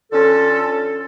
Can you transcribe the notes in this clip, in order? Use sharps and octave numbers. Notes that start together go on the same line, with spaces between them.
D3 C#4 F4 A4